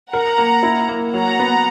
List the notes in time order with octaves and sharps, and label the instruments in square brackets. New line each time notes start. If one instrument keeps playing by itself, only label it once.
[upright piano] A#4 [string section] F#5 A#5
[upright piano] A#3
E4
A#3
[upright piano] F#3 [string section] F#5 A#5
[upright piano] B3